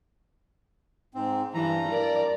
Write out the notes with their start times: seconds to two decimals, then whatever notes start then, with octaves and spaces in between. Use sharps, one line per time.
1.14 G#2 C4
1.54 G2 E3 A#5
1.88 A#4 D5